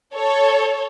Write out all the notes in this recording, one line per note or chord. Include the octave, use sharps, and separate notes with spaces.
A4 C#5